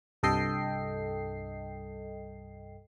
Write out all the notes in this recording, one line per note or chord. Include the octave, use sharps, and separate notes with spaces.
C2 G2 A4 D#5 G5 C7